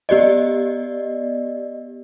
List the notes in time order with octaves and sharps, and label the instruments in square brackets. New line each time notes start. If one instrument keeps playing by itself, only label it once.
[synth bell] B3 G4 D5 D#5